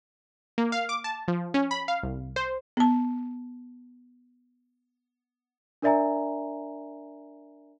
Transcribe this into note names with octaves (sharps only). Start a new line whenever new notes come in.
A#3
F5
D6
A5
F3
C#4
B5
F5
C2
C5
B3 A5
D4 A#4 D5 E5 G#5 A#5